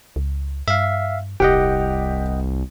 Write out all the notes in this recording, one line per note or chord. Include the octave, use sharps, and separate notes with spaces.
C#2
G2 E5 F5
D#1 C2 G4 D#5 F#5 G5